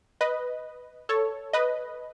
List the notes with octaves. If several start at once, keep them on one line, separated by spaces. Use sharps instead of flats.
B4 D#5
A4 C#5
B4 D#5